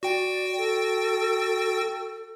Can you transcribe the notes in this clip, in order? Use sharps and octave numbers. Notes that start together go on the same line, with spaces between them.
F#4 D5 G5
A4